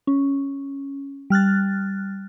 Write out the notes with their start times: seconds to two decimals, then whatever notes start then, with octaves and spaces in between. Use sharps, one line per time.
0.07 C#4
1.30 G3 F6 F#6 A6